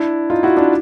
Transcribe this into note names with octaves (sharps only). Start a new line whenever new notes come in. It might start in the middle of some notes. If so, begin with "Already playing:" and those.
Already playing: D4 E4
D#4 F4
E4 F#4
D4 E4